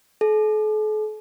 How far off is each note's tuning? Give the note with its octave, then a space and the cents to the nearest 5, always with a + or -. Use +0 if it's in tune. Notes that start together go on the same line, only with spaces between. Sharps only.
A4 -45